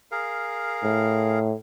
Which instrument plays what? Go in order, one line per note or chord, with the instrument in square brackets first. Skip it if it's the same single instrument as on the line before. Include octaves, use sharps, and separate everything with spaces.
[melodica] G#4 A#4 F5
[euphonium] A2